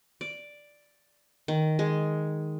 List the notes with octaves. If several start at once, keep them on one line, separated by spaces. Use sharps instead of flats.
D5
D#3
G#3